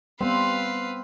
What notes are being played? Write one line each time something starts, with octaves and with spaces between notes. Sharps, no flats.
G3 B3 C4 B4 F5